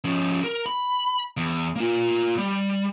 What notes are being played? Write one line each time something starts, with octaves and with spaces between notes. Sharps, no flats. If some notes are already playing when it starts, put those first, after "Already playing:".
F3 C#4
A#4
B5
E2
A#3 F4
G3